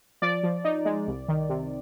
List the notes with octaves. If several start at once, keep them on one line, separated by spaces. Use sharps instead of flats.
F3 D5
F3
D#4
G#3
C2
D#3
C3